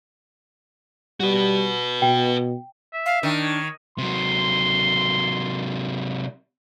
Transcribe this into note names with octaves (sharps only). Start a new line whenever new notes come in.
G3 F#4 B4
B2 G5
E5
F5
D#3 D4
C#5
C3 F#3 C6